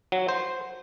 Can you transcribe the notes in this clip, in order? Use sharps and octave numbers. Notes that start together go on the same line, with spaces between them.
F#3
C5